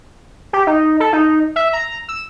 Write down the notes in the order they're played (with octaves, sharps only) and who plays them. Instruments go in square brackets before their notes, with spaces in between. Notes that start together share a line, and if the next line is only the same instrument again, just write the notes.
[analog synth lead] G4
D#4
A4
D#4
E5
A#5
E6